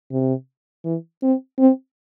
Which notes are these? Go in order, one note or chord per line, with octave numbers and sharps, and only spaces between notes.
C3
E3
C4
C4